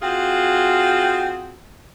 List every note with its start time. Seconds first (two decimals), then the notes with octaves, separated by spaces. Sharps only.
0.02 C4 F4 F#4 G#4